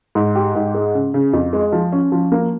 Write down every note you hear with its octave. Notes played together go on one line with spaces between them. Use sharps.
G#2
G4
G#2
G#3
C#3
C#3
F2
G#3
F3
C#4
F3
A#3